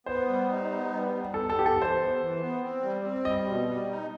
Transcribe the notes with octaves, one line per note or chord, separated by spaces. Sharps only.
B3 C5
G3
D#4
B3
G3
G3
B3 A4
A4
B3 G4
A4
E3
C5
B3
E3
B3
C4
G3
C4
G3 D#5
B2
G3
D#4